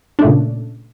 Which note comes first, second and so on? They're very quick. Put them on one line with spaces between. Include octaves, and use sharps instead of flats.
D4 A3 A#2 C#3